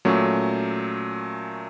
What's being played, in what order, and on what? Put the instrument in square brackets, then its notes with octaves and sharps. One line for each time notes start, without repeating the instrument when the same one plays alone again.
[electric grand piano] A#2 F#3 A3 C#4